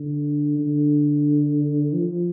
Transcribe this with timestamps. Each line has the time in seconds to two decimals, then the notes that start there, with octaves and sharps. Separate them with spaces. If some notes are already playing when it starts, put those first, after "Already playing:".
Already playing: D3
0.59 D3
1.94 F3